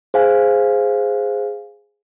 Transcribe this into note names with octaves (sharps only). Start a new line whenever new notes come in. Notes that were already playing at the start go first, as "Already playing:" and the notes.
G#4 C5 F5 G#5